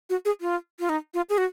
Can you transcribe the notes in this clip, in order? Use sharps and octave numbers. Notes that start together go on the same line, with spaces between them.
F#4
G#4
F4
F4
D#4
F4
G#4
F#4